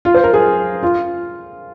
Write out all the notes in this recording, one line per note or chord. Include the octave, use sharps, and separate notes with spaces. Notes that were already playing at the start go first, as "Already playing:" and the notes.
F4
C5
A#4
G#4
F4